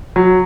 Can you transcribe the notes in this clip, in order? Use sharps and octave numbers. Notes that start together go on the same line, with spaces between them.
F#3